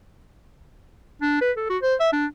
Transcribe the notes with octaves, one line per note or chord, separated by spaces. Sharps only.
D4
B4
A4
F#4
C5
E5
D4